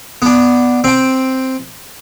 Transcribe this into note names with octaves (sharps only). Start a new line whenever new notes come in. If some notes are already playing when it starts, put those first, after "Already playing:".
B3 D4
C4 G5